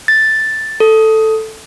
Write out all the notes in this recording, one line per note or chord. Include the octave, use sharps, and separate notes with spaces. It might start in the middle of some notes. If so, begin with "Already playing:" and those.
A6
A4